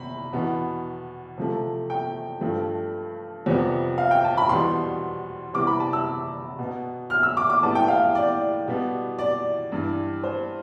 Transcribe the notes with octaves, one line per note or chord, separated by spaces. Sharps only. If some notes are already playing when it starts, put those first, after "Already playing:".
Already playing: C3 B5
E2 B2 B3
C3 F3 A3
G5
G2 F3 A3
F2 C3 G3 B3
F5
G5
A5
B5
E2 B2 G3 B3 C6
C3 E3 G3 B3 D6
B5
A5
E6
B2 B3
F6
E6
D6
D6
A2 G3 B3 A5
G5
F5
D5
B2 G3 B3
D5
G2 E3 G3
C5